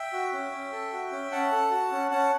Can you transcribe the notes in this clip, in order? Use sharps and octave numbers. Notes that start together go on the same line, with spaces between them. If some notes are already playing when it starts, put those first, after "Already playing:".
Already playing: E5 G5
F#4
C#4
C#4
A4
F#4
C#4
C#4 F#5 A5
A4
F#4
C#4
C#4 F#5 A5